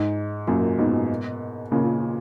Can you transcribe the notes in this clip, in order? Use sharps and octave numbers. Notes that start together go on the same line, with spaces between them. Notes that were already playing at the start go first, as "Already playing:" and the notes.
Already playing: G#2
F#2 A#2
G#2 B2
A#2 C#3